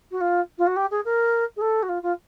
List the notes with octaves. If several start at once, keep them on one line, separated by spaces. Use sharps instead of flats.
F#4
F4
F4
F#4
G4
G#4
A#4
G#4
A4
F#4
F4
F4